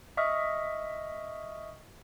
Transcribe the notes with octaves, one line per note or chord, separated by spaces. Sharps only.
D#5 E5 C#6 D#6 F6